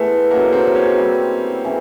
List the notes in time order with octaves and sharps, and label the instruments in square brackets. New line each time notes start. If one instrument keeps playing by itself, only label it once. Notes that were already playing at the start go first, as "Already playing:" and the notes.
Already playing: [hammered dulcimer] E3 G#3 B3 [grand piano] A3
[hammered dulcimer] C#3 F#3 A3 [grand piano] A#3
[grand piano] C4
C#4
[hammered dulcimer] G3 C4 E4
C#3 E3 A3